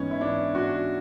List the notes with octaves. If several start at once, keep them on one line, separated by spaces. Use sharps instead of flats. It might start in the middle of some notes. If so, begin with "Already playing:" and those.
Already playing: G#2 E3 B3 C#4
E4
D4
D4 F#4